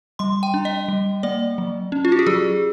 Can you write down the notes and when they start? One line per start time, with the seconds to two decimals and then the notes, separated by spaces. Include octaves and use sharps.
0.19 G3 C6
0.43 G5
0.54 D4
0.65 D#5
0.88 G3
1.23 A#3 D5
1.58 F#3
1.92 C#4
2.05 F4
2.12 F#4
2.19 G4
2.27 F#3 G#4